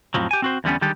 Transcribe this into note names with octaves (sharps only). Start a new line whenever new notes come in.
F2 A2 F3 F#3
G4 G#5
C4 F#4 C5
E2 D3 G3 B3 C#4
D3 D#3 G3 G#3 G4 A4